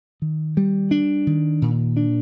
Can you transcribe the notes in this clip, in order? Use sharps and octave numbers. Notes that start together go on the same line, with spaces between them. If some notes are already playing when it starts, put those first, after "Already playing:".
D#3
G3
D4
D#3
A#2
D4